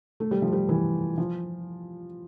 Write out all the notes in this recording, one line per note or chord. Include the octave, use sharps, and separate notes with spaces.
A3
G3
F3
G3
E3
F3